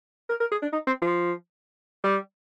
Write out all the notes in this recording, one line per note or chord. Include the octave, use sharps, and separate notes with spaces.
A#4
A#4
G#4
D4
D#4
C4
F3
G3